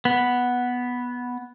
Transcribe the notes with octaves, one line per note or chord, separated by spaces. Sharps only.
B3